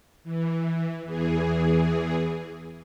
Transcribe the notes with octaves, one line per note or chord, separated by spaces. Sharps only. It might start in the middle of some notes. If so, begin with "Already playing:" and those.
E3
E2 E3 G#4